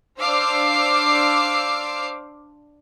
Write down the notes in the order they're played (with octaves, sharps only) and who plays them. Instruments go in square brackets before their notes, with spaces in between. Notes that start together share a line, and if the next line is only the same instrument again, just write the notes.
[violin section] D4 C5 F5 D6 E6 C7